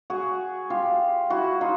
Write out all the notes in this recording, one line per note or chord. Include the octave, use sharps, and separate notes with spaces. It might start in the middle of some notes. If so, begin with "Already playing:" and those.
F#4 G#4
F4 G4
E4 F#4
D#4 F4